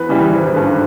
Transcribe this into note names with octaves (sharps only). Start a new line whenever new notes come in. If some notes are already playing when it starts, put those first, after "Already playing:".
Already playing: E2 B4
C#3 E3 G3
G#1
G2 D3